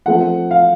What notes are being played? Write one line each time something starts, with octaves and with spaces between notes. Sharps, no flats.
F3 A3 C4 F#5
F5